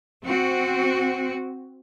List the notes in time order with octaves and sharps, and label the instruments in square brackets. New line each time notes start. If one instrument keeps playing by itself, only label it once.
[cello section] C4 F#4